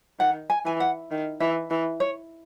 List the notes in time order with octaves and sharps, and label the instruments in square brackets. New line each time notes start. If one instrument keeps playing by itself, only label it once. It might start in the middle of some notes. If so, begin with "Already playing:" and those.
[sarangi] D#3 [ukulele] F#5
[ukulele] G#5
[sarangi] E3 [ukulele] G#5
[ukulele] F#5
[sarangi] D#3
[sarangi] E3 [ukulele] E5
[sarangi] E3
[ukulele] C#5